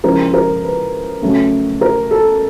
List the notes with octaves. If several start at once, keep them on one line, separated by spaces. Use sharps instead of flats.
C#3 F3 G#3 C#4 E4 A#4
A#4
B4
C#3 F#3 A3 C#4
A#4
A4